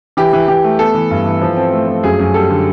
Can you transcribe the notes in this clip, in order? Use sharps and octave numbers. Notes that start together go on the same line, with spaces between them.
E3 G4
E3
E3 G4
A3
B3 A4
E3
G2
E3
F3
C4
A3
F3
F#2 G#4
F#2
G3 A4
D3